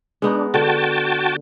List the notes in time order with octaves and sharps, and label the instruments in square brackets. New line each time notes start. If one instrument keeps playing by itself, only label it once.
[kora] G#3 B3 D#4 [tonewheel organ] D4
[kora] D3 [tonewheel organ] F#4 G5 A5